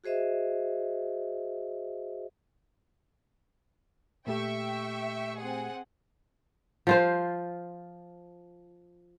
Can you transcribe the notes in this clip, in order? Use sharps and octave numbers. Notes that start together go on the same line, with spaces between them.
F#4 G#4 C5 D#5 E5
A#2 A3 G4 E5 G5 C#6
C4 G#4 F#5
F3 F4 C5